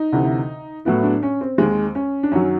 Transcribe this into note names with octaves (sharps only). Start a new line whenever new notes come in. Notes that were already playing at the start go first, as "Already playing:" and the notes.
Already playing: D#4
D2 C3 E3
A2 F#3 B3 E4
D4
C#4
C4
D#2 D#3 G#3
C#4
D4
F#2 D#3 F#3 C#4